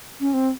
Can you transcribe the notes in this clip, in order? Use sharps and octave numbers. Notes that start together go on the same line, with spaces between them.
C#4
C4